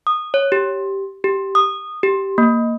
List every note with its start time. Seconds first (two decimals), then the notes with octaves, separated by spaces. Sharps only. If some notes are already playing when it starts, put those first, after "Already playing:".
0.07 D#6
0.34 C#5
0.52 G4
1.24 G4
1.55 D#6
2.03 G4
2.38 A#3